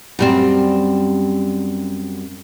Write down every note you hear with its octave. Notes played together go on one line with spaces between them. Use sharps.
F#2 G3 C4